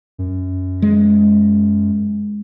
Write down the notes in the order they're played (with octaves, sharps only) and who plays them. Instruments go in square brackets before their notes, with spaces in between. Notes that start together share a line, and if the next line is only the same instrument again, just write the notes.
[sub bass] F#2
[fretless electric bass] G#3